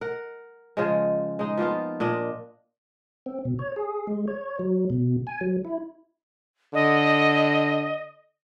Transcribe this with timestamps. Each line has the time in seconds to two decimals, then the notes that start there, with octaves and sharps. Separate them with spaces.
0.01 A#4 F#5
0.77 C#3 F3 G#3
1.39 G#3 D#4
1.57 F3 A#3 B3 F4
2.00 A#2 D4 D#5
3.26 C4
3.45 B2
3.59 C#5
3.76 G#4
4.07 G#3
4.28 C#5
4.59 F#3
4.90 B2
5.27 G#5
5.41 F#3
5.65 E4
6.74 D3 D#5